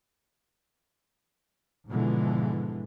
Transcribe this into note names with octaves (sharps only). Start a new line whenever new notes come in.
G#2 B2 D3 E3 F3 G#3